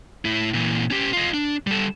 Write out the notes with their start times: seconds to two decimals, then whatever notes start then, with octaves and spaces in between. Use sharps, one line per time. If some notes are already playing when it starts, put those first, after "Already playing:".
0.25 A2 E4
0.54 A#2 E3
0.91 C#4 G4
1.13 F4 D#5
1.34 D4
1.67 G3 A4